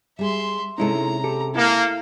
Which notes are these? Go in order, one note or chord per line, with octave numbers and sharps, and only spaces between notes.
G3 G#4 E5 C6
C3 G#3 C#4 D#4 E4 A4 A#5
G4 A4
A#3 E4 A4